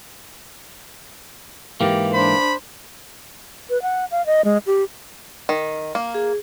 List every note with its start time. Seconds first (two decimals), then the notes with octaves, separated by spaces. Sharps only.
1.81 G#2 E3 A#3 G4
2.14 D4 C5 B5
3.70 B4
3.82 F#5
4.11 F5
4.26 D#5
4.45 G#3
4.66 G4
5.49 D#3
5.95 A#3
6.15 G#4